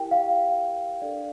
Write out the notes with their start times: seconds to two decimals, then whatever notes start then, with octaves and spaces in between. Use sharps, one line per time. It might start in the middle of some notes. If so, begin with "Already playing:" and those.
Already playing: E4 G4 A#4 G5
0.11 F5
1.02 D4 A4 D5